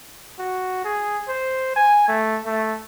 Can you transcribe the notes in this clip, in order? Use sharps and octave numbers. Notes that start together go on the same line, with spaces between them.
F#4
G#4
C5
G#5
A3
A3